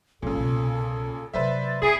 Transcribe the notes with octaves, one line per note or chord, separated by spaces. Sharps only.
G#1 A#2 C#3 F#3 A4
C2 B2
C3 F#3 B4 C5 D5 E5
C4 E4 G#4